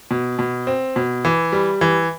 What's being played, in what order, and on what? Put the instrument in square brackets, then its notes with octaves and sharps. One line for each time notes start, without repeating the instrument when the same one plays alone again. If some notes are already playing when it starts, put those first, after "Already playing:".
[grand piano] B2
B2
C4
B2
E3
G3
E3